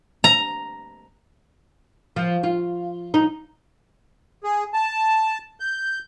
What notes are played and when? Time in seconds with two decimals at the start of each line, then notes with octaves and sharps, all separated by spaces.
0.24 A#5
2.16 F3
2.43 F4
3.14 D#4
4.44 G#4
4.74 A5
5.60 G6